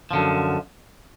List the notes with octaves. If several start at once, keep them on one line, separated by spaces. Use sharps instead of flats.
F#2 D3 F3